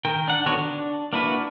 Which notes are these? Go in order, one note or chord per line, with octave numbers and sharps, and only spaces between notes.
D#3 A#4 G5
D4 F#5
D3 D#3 B3 F#4 C#5
D4
A#3 D4 E4 F#4 B4